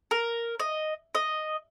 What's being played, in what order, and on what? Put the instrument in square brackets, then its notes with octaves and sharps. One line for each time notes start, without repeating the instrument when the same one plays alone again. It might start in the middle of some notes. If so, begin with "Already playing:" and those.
[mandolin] A#4
D#5
D#5